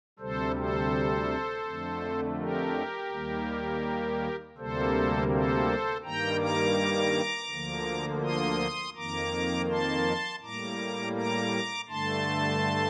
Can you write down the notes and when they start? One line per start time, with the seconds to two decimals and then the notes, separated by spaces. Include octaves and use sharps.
0.19 D2 C3 G3 A4 C5
0.56 A4 C5
1.66 F2 D3 A3
2.38 G4 A#4
3.11 D#2 D#3 G3 A#3
4.57 D2 C3 G3 A#3 A4 C5
5.31 A4 C5
6.04 G2 D#3 G3 A#3 G5 A#5
6.41 A#5 D6
7.50 D2 D3 F3 A#3
8.24 C6 D#6
8.96 F2 D#3 A#3 A#5 D6
9.70 A5 C6
10.42 A2 G3 A#3 A#5 D6
11.15 A#5 D6
11.89 G2 D3 A3 A5 C6